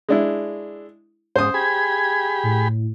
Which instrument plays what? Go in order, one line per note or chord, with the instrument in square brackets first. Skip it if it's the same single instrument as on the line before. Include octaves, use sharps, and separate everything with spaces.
[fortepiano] G#3 D4 E4
[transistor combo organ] G#2 [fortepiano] C5 D#6
[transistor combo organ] G4 G#4 B5 [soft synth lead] G#6
[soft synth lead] A2